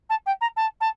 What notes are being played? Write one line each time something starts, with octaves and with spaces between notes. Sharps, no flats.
A5
G5
A#5
A5
A5